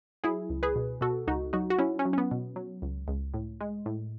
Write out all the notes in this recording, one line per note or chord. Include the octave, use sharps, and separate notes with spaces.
F#3 E4 G#4
C#2
G#4 B4
B2
B2 F#4 A4
C#2 D#4 F#4
F#3 D#4 F#4
F#4
F#3 C#4 E4
C#4
F#3
C#4
B3
B2
F#3
C#2
C#2
A2
G#3
A2